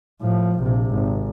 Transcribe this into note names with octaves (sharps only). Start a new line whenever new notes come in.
A2 F3
A#1 C3
G#1